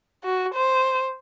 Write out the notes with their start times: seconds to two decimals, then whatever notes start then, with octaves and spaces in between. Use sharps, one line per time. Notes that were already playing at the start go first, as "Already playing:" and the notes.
0.24 F#4
0.55 C5